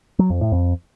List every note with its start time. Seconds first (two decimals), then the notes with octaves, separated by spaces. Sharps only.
0.19 F#3
0.30 F2
0.41 A2
0.52 F2